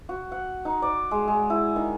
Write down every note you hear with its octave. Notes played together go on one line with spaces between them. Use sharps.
F#4
F#5
D#4
D5
G#3
G#3
E4
D#3